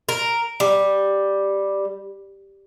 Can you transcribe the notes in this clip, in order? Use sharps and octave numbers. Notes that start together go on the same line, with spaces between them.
A#4
G3